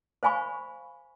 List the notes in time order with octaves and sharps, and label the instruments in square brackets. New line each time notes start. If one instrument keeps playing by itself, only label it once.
[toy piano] C5 F5 G#5 B5 C#6